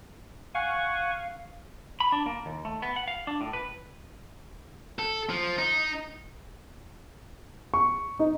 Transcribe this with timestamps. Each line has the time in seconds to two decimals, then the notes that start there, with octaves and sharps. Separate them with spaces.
0.55 F5 F#5 G#5 C#6
2.00 B5
2.12 D4
2.26 A#3
2.46 D#2
2.65 A3
2.82 B3
2.96 F#5
3.08 F5
3.27 D4
3.41 A2
3.53 B4
4.99 A4
5.30 F3
5.58 D#4
7.74 C#6
8.19 D#4